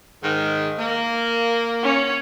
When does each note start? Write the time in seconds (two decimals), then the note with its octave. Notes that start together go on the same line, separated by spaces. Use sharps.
0.23 G#2 D#3
0.79 A#3
1.83 C#4 C#5